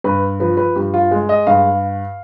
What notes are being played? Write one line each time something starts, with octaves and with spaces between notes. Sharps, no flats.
G2 B4
F3 B4
B4
G2 G4
F4
G#3
D#5
G2 F5